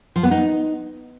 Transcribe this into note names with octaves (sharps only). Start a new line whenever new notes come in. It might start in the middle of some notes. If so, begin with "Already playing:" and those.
F3
B3
D#4